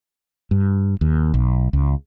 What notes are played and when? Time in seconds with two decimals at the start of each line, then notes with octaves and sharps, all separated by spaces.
0.51 G2
1.01 D#2
1.34 B1
1.73 C#2